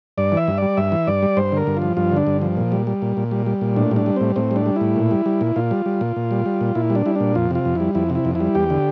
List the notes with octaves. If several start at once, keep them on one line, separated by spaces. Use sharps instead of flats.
G2 D5
E3
E5
G2
G3 D5
G2 E5
E3
G2 D5
G3
G2 C5
D3 A#4
G2
F3 F4
G2 F4
D3 D4
G2
F3
A#2
G3
G3
A#2
A#2
G3
G3
A#2
A2 D4
G3
D4
G3
A2 C4
A2 C4
G3
D4
G3
A2 E4
A#2
G3
G3
A#2
A#2 F4
G3
G3
A#2
A#2
G3
G3
A#2
A#2 E4
G3
D4
G3 E4
A#2 D4
F2 F4
C3 F4
F2
G3 E4
F2 E4
C3
E4
F2
E4
G3
E2 G4
D3